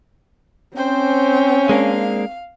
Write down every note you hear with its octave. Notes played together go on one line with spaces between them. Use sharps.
C4 C#4 C5 G5
G#3 A#3 D4 F5